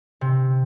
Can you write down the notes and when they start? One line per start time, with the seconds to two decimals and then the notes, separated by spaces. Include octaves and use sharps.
0.21 C3